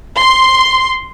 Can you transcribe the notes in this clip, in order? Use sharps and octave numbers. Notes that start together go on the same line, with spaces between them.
C6